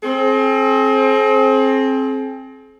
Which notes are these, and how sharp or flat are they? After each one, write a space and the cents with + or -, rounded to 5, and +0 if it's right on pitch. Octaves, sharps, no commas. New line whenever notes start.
C4 +25 G#4 +45